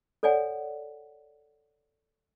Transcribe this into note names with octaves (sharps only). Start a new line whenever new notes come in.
A4 C#5 D5 F#5 G#5